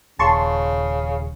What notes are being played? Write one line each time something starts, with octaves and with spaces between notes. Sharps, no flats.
D#1 C#3 A5 C6 C#6